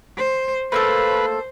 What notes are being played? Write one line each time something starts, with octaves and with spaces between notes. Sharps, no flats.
C5
A3 A#3 A4 B4 C5